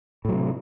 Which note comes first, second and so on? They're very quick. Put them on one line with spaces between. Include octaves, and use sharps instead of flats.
A2 F#3 C3